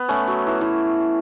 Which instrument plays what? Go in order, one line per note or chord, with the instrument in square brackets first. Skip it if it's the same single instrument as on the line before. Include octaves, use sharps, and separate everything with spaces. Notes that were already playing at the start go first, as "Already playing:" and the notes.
Already playing: [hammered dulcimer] B3
A3 C#4
F#3
E3
E3